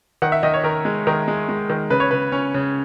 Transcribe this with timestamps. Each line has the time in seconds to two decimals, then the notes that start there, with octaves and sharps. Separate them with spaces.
0.22 D#3 F#5
0.32 E5
0.43 D#3 D#5
0.54 C#5
0.64 D#3 A#4
0.85 G#3
1.07 D#3 A#4
1.28 G#3
1.49 G#3
1.70 D#3
1.90 C#3 B4
2.00 C#5
2.11 C#3 B4
2.32 C#4
2.54 C#3